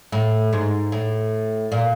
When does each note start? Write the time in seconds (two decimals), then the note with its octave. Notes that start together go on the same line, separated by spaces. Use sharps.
0.12 A2
0.53 G#2
0.92 A2
1.72 A#2